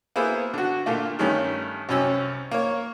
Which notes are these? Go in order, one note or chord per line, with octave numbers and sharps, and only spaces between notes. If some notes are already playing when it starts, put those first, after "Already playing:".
A#3 B3 E4 G#4 C5
D3 F#4
A#2 D3 A3 A#3 F4
G2 D#3 G3 A3 C#4
C2 F#2 C#4 E6
A#3 C#5